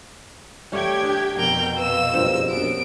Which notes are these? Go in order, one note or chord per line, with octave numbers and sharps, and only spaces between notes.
G3 A3 G4 C#5 G5 G#6
D4 G#4
F2 B2 A#4 G5
B4 F5 E6 E7
F#1 G2 C4 F4 A#4
A#1 F#2 B3 D7